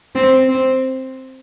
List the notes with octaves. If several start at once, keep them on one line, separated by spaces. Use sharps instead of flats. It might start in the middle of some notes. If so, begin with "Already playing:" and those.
C4
C4